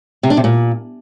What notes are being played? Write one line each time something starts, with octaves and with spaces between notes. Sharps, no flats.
C3
D4
C3
A#2